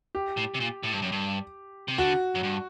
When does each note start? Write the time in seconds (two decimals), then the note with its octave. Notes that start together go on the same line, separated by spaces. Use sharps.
0.15 G4
0.37 A2
0.54 C3
0.60 A#2
0.83 A2
0.92 G2
1.02 F#2
1.12 G2
1.88 C3
1.98 D3 F#4
2.35 F#2
2.43 G2